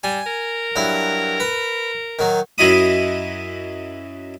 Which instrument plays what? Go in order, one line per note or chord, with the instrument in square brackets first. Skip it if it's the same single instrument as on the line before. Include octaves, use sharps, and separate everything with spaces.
[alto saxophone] G3 [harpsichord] G#5
[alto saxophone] A#4
[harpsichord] G2 F#3 E4
B4
D#3 F#3
F#2 F#3 E4 D#5 B5 D#6